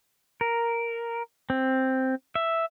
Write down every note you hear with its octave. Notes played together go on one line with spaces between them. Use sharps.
A#4
C4
E5